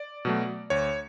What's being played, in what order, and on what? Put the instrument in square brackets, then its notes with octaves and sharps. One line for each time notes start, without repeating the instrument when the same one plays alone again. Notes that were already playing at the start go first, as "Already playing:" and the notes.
Already playing: [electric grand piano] D5
B2 F#3 A3
D2 C#5